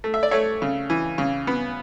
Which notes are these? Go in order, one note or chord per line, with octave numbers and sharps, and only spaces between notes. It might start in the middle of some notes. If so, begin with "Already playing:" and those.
A3
E5
D5
A3 C#5 E5
C#3
E3
C#3
B3